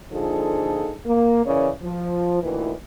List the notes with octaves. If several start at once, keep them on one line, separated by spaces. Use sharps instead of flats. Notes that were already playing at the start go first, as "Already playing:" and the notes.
A#2 D3 F3 D#4 G#4 A4
A#3
C#3 E3 C#4 A#4 C#5 D5
F3
D2 A#2 D#3 E3